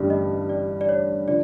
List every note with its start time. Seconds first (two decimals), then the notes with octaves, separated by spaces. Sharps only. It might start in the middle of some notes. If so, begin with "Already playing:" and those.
Already playing: A1 G2 D3 G3 D5
0.10 D#5
0.50 D5
0.81 D5
0.89 C#5
1.28 D3 F3 D5